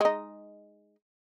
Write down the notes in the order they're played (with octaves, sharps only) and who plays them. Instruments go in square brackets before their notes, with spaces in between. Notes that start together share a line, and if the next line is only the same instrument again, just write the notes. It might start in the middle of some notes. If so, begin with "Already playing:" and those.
[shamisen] G#3 D#4